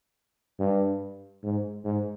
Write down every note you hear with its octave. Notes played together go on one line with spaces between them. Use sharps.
G2
G#2
G#2